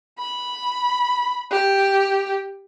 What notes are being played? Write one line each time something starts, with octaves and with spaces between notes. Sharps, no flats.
B5
G4